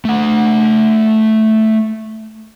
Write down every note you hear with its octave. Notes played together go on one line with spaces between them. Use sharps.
A3 F#5